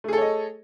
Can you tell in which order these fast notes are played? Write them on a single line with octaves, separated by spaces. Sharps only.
A3 G#4 A4 C#5 D#5